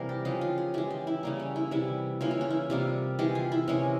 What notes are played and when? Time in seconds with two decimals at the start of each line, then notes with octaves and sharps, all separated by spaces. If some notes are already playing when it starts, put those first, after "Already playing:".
Already playing: C3 E3 G3 A#3 A#4 C5
0.09 G4
0.25 C#3 F3 G#3 G4
0.41 F4
0.58 G#4
0.74 E3 G#3 G4
0.91 G4
1.07 E4
1.23 C#3 G3 A#3
1.40 C#4
1.56 E4
1.71 C3 E3 G3 E4
2.21 C#3 E3 A#3 F4
2.31 E4
2.41 C#4
2.50 E4
2.70 C3 G3 A#3 F4
3.19 E3 G#3 G4
3.35 F4
3.52 E4
3.68 C3 E3 G#3 C#4